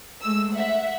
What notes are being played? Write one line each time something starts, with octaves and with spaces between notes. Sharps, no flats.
G#3 A3 E6
E5 F#5